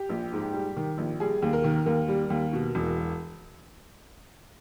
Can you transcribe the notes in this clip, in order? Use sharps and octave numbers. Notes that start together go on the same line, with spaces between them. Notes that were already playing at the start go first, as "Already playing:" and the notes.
Already playing: G4
A#1
G#2
G3
D#3
A#1
G3 G#4
D#2
A#4
D#3
D#2 A#4
G3
D#2
B2
E1